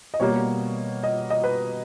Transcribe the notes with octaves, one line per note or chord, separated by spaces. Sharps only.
D#5
B2 G3 A#3 C#5
D#5
D#5
B4